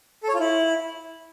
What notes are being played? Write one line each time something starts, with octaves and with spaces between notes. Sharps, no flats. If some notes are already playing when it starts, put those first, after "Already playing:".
A4
C#5
F4
E4